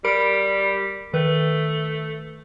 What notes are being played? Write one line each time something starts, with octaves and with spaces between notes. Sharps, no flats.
G3 A#4 B5 D7
D#3 A3 B4